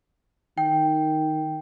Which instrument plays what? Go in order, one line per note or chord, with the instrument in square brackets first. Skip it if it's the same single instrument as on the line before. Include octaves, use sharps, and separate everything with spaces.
[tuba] D#3 [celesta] G5